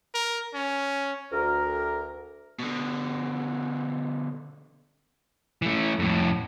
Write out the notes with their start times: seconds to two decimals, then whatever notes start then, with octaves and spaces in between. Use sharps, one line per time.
0.15 A#4
0.54 C#4
1.31 D2 A#4
2.59 B2 D3
5.62 E3 A3
5.99 F2 A2